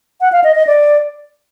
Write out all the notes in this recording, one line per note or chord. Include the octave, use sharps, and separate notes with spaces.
F#5
F5
D#5
D#5
D5